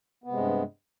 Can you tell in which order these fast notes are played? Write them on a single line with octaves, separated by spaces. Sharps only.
B3 C3 G#3 G2